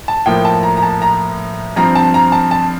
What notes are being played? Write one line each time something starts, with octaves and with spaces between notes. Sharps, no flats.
A5
A2 F3 A#3 G5
A5
A#5
A#5
A5
A#5
G2 F3 C4 A#5
A5
A#5
A5
A5